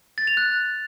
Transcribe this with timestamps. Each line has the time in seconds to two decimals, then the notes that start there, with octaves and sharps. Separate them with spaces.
0.18 A6
0.27 F7
0.37 F#6